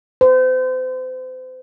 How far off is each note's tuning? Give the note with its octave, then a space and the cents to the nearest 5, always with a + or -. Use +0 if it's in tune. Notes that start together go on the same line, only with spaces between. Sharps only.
C5 -35